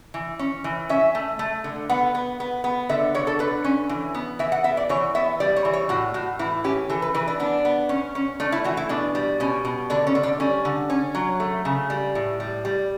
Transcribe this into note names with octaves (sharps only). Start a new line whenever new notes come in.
E3
C#4
E3
C#4 E5
A3
A3
D3
B3 F#5
B3
B3
B3
D3 E5
D3 C#5
A4
D3 B4
C#4
E3
B3
E3 E5
F#5
B3 E5
D5
E3 C#5
B3 E5
G3 D5
C#5
E3
C#5
A2 F#4
A2 F#4
E3 E4
C#4 G4
E3 A4
B4
E3 B4
D4
B3 D4
B3
C#4
C#4
A3 D4
E4
E3 F#4
E4
B2 D4
G3
B2 C#4
B2
D3 D4
C#4
D3
D4
G3 C#4
D3
C#4
F#3
A3
C#3
G3
A2
G3
G3